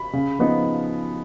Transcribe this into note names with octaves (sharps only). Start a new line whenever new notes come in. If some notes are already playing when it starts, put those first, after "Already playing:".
Already playing: B5
C#3
F3 B3 D#4